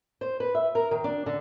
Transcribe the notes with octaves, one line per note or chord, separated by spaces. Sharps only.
C5
B4
E5
A#4
D#3
D4
D3